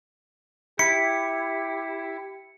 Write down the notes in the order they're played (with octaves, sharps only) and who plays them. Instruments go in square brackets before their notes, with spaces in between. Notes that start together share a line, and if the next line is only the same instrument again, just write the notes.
[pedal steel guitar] E4 [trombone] G4 [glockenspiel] C#7